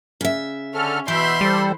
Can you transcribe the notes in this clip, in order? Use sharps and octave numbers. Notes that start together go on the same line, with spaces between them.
C#3 E5
D3 C#4 A4 F6
B2 E3 E5 B5 C6 G6
G3 A4 C5